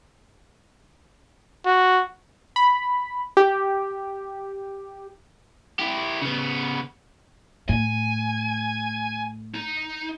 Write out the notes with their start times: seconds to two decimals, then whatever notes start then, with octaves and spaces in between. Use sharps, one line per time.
1.66 F#4
2.56 B5
3.37 G4
5.79 E4 G4
6.21 C#3 B3
7.69 A2 G#5
9.54 D#4